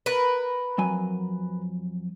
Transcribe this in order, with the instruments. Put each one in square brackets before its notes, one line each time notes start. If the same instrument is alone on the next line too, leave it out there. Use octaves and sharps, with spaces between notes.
[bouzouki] A#4 B4
[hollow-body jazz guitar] F2 F#3 G#5